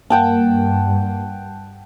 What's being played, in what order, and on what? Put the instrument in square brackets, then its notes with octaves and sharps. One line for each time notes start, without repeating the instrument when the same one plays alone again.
[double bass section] G2 [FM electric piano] A#3 [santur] F#5 G5 A5